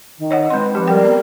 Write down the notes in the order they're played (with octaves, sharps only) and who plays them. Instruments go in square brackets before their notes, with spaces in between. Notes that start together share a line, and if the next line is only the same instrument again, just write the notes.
[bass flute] D#3
[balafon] C#5 D#5 F#5
[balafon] G#3 C6 [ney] C4 [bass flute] B4
[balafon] F3 G4 [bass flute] B4
[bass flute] G3 [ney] A#4 [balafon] G5
[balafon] B3